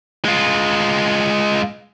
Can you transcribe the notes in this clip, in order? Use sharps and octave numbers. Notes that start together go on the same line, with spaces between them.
G#3 F4